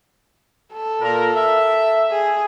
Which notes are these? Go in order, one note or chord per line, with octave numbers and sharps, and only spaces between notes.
A4
A#2 A#4
E5
G#4